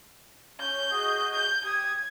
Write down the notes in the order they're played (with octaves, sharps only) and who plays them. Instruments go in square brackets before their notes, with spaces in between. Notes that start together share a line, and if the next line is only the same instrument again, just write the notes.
[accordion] C#4 [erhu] G6
[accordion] F#4 G#4 D#5
[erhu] G6
[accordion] G4 D#6 [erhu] G#6